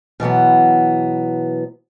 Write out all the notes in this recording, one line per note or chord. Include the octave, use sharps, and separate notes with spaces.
B2 E3 F#3 B3